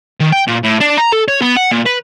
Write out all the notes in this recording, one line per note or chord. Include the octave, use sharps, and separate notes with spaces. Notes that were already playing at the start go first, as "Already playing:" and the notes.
D#3
G5
A#2
A2
D4
A#5
A4
C#5
B3
F#5
A#2
B4